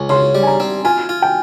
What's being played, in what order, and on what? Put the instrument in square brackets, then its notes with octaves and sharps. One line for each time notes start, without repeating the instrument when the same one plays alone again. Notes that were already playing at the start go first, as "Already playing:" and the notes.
Already playing: [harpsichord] C#2 [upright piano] G#5
[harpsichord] C#3 [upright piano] C6
[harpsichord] G3
[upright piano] G#5
A#5
[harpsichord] C4
[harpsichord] F4 [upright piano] G#5
[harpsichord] F4
[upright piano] G5